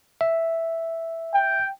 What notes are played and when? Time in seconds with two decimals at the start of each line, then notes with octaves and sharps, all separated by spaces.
0.21 E5
1.34 G5